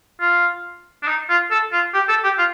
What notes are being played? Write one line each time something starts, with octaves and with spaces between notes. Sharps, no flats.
F4
D4
D#4
F4
A4
F4
G4
A4
G4
F4